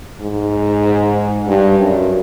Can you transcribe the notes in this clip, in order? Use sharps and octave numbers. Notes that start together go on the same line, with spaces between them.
G#2
G2
F#2